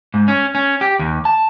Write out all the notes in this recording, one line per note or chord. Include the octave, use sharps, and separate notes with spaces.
G#2
C#4
C#4
G4
D#2
A5